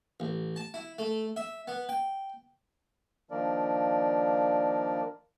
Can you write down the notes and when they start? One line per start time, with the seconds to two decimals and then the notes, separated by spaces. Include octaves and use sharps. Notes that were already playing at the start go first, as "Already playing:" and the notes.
0.20 A1
0.56 A5
0.74 E4
0.99 A3
1.36 E5
1.68 B3
1.89 G5
3.31 D#3 F3 A#3 D4 A#4 D5